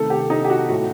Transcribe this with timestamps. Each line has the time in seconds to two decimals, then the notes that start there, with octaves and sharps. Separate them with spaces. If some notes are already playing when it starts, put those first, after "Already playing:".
Already playing: C3 D#3 A3 A4
0.10 G4
0.30 D#4
0.45 G4
0.50 F#4
0.69 A2 A3 F#4